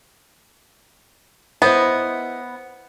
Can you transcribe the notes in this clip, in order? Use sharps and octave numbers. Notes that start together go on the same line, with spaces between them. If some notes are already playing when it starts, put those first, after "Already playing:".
B3 E4 C5 D#5